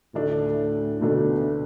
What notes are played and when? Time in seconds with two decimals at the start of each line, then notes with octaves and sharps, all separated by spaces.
0.15 D2 A2 D3 A3 D4
1.01 D2 B2 D3 A3 D4